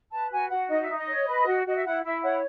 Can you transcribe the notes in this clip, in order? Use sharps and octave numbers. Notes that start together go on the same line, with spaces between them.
B4 A5
F#4 G#5
F#4 F#5
D#4 D#5
E5
D#4
D#5
C#5
B4
F#4
F#4 D#5
E5
E4 F#5
E4 E5
C#5 F#5